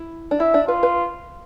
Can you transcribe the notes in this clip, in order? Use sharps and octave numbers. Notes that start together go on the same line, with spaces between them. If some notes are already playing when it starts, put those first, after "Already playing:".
Already playing: E4
D4
E4 E5
D4
F4 B4
B4